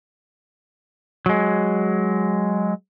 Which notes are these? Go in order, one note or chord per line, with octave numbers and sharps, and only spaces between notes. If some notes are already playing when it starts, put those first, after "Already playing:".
F#3 G#3